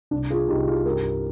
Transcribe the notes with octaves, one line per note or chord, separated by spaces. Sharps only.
C2 D4
F4 G#4
C2 D#4 G4
F4 G#4
G2 G4 A#4